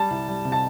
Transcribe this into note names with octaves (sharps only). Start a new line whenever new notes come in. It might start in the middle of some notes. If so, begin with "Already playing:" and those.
Already playing: G3 A5
C2
G3
C3
A5